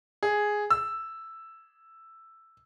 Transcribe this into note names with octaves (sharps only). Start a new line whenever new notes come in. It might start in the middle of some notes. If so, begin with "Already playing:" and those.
G#4
E6